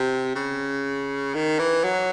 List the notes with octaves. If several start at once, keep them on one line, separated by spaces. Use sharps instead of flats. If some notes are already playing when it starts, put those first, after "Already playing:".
Already playing: C3
C#3
D#3
E3
F#3